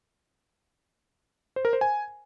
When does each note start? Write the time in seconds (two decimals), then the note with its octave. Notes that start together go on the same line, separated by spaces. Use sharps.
1.56 C5
1.65 A#4
1.73 C5
1.81 G#5